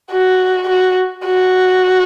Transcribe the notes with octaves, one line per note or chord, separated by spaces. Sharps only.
F#4
F#4
F#4